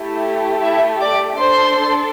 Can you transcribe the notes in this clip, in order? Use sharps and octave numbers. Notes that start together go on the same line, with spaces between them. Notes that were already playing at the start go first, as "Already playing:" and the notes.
Already playing: A3 E4 G4
E4 E5
D5 D6
D4 A4 C5 C6